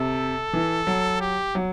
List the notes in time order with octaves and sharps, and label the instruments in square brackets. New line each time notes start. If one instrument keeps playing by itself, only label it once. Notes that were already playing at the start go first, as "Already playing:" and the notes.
Already playing: [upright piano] C3 [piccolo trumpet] A4
[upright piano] E3
F#3
[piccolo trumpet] G4
[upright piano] F#3